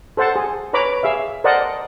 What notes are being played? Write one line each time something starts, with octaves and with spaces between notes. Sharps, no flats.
A4 C5 F#5 A5
G#4
B4 C#5 A#5 B5 D6
G#4 E5 F5
A#4 C5 D5 D#5 F#5 A5